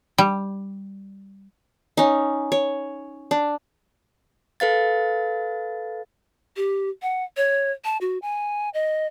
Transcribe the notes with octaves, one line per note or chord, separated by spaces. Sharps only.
G3
C#4 D#4
C#5
D4
A4 B4 F5 A6
G4
F#5
C#5
A5
F#4
G#5
D#5